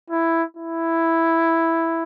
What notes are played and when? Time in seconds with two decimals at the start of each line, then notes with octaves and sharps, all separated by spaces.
0.10 E4
0.57 E4